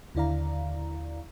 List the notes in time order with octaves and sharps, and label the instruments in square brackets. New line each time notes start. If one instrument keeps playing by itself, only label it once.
[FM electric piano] D#2 D3 E4 D5 F5 A#5